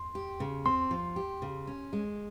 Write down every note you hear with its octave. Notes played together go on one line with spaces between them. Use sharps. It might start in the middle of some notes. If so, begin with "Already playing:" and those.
Already playing: C6
G4
C#3
C4 C6
F3
G4
C#3
C#4
G#3